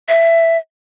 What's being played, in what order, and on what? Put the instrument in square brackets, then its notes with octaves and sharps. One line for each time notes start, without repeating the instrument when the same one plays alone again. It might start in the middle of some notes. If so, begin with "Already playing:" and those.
[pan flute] E5